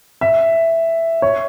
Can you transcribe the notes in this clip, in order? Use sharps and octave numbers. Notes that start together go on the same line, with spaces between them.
E5
C#5